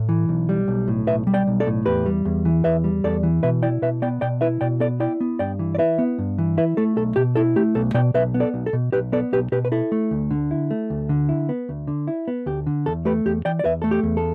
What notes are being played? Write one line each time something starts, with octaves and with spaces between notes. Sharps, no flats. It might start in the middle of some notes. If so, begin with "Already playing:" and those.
Already playing: A2
E3
B1
G3
B1
A2
B1 B4 E5
G3
D5 G5
B1
A4 D5
A2
E2 G4 B4
G3
E2
E3
E2 B4 E5
G3
E2 A4 D5
E3
B2 B4 E5
E4 D5 G5
B2 B4 E5
B3 D5 G5
B2 D5 G5
E4 B4 E5
B2 D5 G5
B3 A4 D5
E4 D5 G5
B3
G2 D5 G5
E3
D5
E4 B4 E5
B3
G2
E3
E4 B4 E5
A3 A4
B1 A4
B2 G4
E4 A4
A3 G4
B1 A4
B2 D5 G5
B1 B4 E5
B3
A4 D5
B1
A4
B2
B1 G4 B4
B3 A4 D5
B1 G4 B4
B2 G4 B4
B4
E4 A4
A3
D2
D3
E4
A3
D2
D3
E4
B3
D2
D3
E4
B3
D2 G4
D3
E2 A4
A3 G4 B4
E2 G4
E3 D5 G5
D5
E2 B4 E5
A3 A4
G4
E2
A4